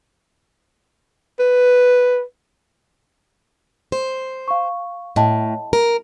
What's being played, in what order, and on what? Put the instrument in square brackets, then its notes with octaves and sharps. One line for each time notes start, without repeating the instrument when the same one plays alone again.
[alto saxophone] B4
[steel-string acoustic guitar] C5
[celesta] F5 C#6
[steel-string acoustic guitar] A2 [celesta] D#5 G5 A5
[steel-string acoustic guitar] A#4